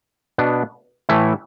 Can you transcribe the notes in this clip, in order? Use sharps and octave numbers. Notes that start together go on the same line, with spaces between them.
B2 B3 D4
A2 E3 A3 E4